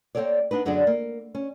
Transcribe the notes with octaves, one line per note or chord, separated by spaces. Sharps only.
A#3 C4 C#4 A4 C#5 D5
B3 D4 D#4 B4
F#2 D3 F#3 D4 G#4 D5
A#3
C#4